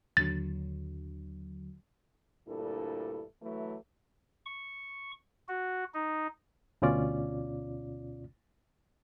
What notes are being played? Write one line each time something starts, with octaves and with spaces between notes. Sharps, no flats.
D#2 D3 F#3 A6
D2 G2 A#2 E4 A4
E3 F#3 A3
C#6
F#4
D#4
D2 B2 C#4 F4 D5